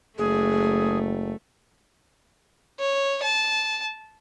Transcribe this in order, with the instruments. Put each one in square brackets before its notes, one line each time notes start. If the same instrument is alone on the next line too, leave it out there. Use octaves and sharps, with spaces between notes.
[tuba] F#1 [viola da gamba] A3 [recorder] G#4
[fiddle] C#5
A5